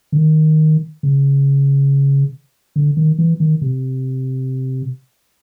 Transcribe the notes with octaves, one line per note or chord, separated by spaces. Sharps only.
D3
D#3
C#3
D3
D#3
E3
D#3
C3